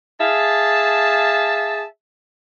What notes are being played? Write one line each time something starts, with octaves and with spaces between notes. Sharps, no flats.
G#4 E5 F5 A5